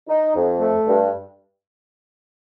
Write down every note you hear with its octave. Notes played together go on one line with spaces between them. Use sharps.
D#4
F2
A3
G2